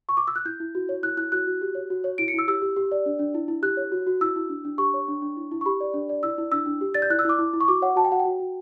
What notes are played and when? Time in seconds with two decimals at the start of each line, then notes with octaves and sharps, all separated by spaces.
0.09 C#6
0.17 D6
0.28 E6
0.36 F#6
0.45 E4 G6
0.60 E4
0.75 F#4
0.89 C#5
1.03 E4 F#6
1.17 E4 F#6
1.32 F#4 F#6
1.47 F#4
1.62 G4
1.75 C#5
1.90 F#4
2.04 C#5
2.18 E4 D7
2.28 C#7
2.34 E4 E6
2.48 G4 E6
2.62 G4
2.76 G4
2.92 D5
3.06 D4
3.19 D4
3.34 E4
3.48 E4
3.63 G4 F#6
3.77 C#5
3.92 F#4
4.07 F#4
4.21 E4 E6
4.36 E4
4.49 D4
4.65 D4
4.78 G4 C#6
4.94 C#5
5.08 D4
5.22 D4
5.37 E4
5.51 E4
5.61 C#6
5.66 G4 B5
5.80 D5
5.94 D4
6.09 D5
6.23 E4 E6
6.38 E4
6.52 D4 E6
6.66 D4
6.81 G4
6.94 D5 A6
7.02 G6
7.10 E4 F#6
7.19 E6
7.25 E4 D6
7.39 E4
7.53 E4
7.61 C#6
7.68 F#4 D6
7.82 C#5 F#5
7.96 F#4 A5
8.05 G5
8.11 F#4 F#5
8.20 G5
8.25 F#4
8.39 F#4